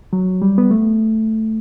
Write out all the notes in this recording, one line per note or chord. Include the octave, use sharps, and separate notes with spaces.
F#3
G3
B3
A3